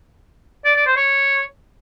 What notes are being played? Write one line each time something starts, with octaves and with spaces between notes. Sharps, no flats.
D5
D5
C5
C#5